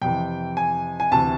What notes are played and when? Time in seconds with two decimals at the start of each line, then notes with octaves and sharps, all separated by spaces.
0.01 F2 C3 E3 G5
0.57 G#5
1.00 G#5
1.11 D2 C3 E3 A5